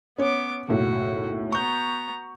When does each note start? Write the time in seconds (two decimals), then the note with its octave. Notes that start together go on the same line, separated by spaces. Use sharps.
0.18 B3 C#4 C#5 D6
0.69 F#1 B1 A2 F#4
1.52 B3 A#5 C#6 G6